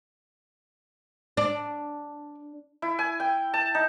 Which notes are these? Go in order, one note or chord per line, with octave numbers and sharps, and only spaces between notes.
D4
E4
G#5
G5
A5
D#4